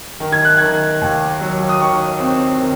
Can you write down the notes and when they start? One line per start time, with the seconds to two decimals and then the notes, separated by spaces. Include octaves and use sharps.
0.20 D#3
0.32 G#6
0.45 F#6
0.58 D#3 G#6
1.01 D#2
1.41 F#3
1.69 D#6
1.81 D#3 C#6
2.20 C4
2.60 D#3